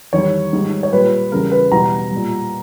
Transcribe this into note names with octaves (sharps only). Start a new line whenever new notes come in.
E2 D#3 G3 C#5
G#2 D#3 G3
C#5
A#2 G3 B4
E2 C#3 G3 A#4
B4
E2 B2 G3 A#5
G3
A#2